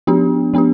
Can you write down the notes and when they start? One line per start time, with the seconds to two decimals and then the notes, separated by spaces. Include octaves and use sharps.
0.07 F3 B3 D4 G4
0.54 F3 B3 D4 G4